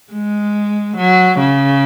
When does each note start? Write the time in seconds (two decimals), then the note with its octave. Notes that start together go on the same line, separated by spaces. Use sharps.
0.13 G#3
0.97 F#3
1.39 C#3